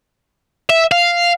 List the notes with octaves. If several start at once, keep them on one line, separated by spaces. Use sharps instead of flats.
E5
F5